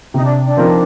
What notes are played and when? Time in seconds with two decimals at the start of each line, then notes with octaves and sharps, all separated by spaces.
0.13 C3 D#4
0.24 D4
0.44 D4
0.57 F3 C4 D#4 A#4